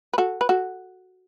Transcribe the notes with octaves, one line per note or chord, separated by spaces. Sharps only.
B4
F#4 A4
B4
F#4 A4